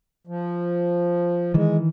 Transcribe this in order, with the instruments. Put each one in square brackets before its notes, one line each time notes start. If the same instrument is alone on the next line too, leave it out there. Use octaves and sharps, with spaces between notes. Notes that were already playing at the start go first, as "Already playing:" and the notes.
[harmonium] F3
[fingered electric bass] D#3 E3 [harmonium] G#3